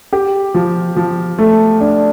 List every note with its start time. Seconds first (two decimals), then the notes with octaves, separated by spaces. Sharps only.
0.13 G4
0.54 F3
0.96 F3
1.38 A3
1.80 D4